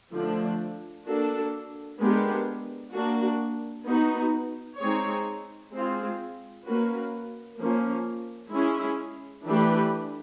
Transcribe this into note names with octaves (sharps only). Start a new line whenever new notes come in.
D3 F3 A3 D4
A#3 D4 F#4 A4
G#3 B3 D4 G4 A#4
A#3 D4 F#4
B3 D#4 F#4
G#3 C4 D#4 G#4 C#5
G#3 C4 F4 G#4
A#3 C#4 F#4 B4
F3 A#3 C#4
G#3 C#4 E4 G#4
E3 A3 D4 G4 B4